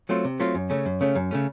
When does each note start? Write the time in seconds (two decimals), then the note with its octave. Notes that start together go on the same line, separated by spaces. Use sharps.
0.09 F#3 A3 C4 F4
0.25 C3
0.40 F#3 A3 C4 F4
0.55 F#2
0.70 C#3 A3 C#4
0.86 F#2
1.01 C#3 A3 C#4
1.15 F#2
1.31 C#3 A3 C#4